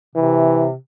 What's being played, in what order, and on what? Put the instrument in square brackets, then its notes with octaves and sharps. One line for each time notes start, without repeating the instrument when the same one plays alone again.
[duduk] C3 [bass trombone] E3